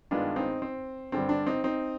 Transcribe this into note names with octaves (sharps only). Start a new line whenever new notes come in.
G2 D#3 G#3 B3 D4 F4
C4 D#4
C4
G2 D3 G3 C4
D4
C4 D#4
C4 D#4